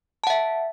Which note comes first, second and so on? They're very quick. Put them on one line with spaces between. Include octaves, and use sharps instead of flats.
A5 F#5 E5